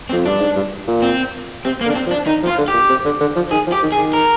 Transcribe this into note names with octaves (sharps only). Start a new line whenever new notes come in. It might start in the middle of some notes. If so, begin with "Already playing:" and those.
C4
F2
G2 D4
G#2
G2
A#2
C4
C3 C4
A#3
D3
D4
C4
F3
D4
D#3 D#4
F3
F4
D3
G4
A#2
C3
D3
D3
F3
D#3 G#4
F3
G4
D#3
G#4
D#3
A#4